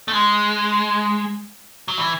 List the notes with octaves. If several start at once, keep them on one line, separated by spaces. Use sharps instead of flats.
A3
G#3
F#3
E3